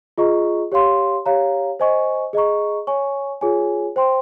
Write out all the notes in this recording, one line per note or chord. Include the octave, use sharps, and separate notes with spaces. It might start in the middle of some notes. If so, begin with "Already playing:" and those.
F4 G#4 D#5 A#5 C#6
G4 C#5 F5 C6
G4 C#5 F5 A#5
C5 D#5 G#5 C#6
G#4 D#5 A#5 C#6
C#5 G#5 C#6
F4 G#4 C#5 G#5
C5 G5 C6